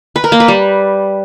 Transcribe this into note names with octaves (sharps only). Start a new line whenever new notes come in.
B4
A#4
A#3
B4
G3